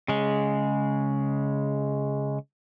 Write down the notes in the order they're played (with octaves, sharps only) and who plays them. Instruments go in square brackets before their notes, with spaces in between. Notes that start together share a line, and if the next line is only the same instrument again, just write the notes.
[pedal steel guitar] C#3 G#3